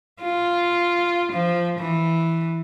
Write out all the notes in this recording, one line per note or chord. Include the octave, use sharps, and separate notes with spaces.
F4
F3
E3